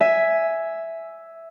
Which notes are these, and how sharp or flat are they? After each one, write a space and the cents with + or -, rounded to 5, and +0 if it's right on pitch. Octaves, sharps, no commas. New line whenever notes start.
E5 +0 G#5 +5